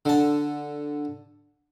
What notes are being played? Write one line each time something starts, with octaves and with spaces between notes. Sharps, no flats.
D3 A5